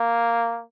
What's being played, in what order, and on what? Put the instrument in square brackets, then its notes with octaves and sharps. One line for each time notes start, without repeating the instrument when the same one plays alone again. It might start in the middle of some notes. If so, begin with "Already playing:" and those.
Already playing: [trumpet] A#3